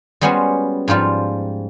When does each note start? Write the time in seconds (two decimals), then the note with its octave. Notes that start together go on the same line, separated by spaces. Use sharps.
0.21 G3 G#3 B3 C#4 F#4 C5
0.88 G#2 F3 G3 F4